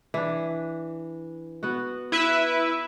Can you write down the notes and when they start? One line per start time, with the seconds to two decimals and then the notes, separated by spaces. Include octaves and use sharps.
0.14 E3 D4
1.63 B3 F#4
2.12 E4 B4 E5